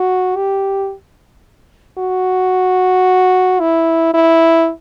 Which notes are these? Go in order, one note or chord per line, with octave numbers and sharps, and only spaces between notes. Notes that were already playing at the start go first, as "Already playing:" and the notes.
Already playing: F#4
G4
F#4
E4
E4